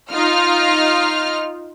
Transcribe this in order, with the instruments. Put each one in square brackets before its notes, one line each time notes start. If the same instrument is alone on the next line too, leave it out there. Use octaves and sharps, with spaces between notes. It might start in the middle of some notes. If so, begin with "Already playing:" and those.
[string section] D#4 F4 F6